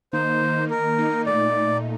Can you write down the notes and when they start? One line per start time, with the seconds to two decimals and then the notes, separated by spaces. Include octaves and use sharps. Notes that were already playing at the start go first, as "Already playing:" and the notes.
0.13 D#3 A#3 D#4 C5
0.42 D#3 A#3 D#4
0.70 D#3 A#3 D#4 A#4
0.98 D#3 A#3 D#4
1.26 A#2 A3 D#4 D5
1.55 A#2 A3 D#4